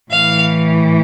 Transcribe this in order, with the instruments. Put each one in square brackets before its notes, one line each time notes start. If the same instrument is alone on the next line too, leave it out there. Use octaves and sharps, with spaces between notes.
[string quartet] A2 E3 F5